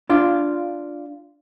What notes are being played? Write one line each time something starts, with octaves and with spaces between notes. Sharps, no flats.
D4 F4